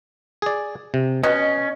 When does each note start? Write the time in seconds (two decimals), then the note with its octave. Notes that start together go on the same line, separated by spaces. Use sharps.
0.42 G#4 D5
0.94 C3
1.23 B2 C#4 D#5